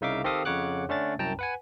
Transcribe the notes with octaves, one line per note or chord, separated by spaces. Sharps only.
C2 C#3 D#4 E5 F5 D6
D#3 C4 G4 A4 F5 D#6
F2 C#3 C#5 F#5 D6 F#6
D3 A3 C#4 D4 A6
C2 F#2 G5 A5 A#5
B4 F#5 G#5